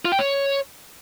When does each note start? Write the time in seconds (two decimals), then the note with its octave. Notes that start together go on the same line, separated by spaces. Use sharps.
0.05 F4
0.12 G5
0.19 C#5